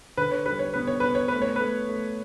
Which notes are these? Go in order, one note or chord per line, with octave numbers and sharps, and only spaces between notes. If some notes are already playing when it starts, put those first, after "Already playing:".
D3 B4
C#5
G3 B4
C#5
B3 B4
C#5
B3 B4
C#5
A3 B4
C#5
B4
A3
A3